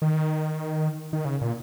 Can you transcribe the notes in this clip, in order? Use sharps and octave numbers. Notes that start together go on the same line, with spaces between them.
D#3
D#3
C#3
A#2